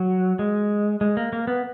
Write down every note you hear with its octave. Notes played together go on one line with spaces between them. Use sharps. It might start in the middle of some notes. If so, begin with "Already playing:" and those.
Already playing: F#3
G#3
G#3
A#3
A#3
B3